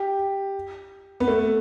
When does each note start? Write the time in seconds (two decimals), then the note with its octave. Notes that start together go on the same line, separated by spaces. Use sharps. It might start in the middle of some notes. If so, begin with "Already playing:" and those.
Already playing: G4
1.20 B3
1.28 A3